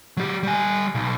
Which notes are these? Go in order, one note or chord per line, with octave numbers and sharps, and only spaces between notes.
F#3 G4
G3 G#5
B1